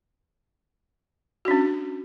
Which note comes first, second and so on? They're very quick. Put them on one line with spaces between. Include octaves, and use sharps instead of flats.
F#4 D4 C#4